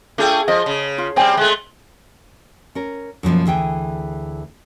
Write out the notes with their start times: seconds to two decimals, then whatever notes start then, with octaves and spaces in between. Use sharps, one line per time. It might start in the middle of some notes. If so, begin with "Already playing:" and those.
0.18 A3 D4 F4 G#4 G5
0.48 F3 D#5
0.66 C#3
0.98 F4
1.16 G3 C4 G#4 G5 G#5
1.37 G#3 A3
2.75 C#4 A#4
3.23 F#2 B2 F3 A#3
3.46 D2 E3 G#4 G5